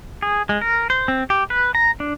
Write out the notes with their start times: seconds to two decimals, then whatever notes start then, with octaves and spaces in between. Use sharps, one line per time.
0.22 G#4
0.49 G#3
0.61 A#4
0.90 C5
1.08 C4
1.30 G4
1.50 B4
1.75 A#5
2.00 D4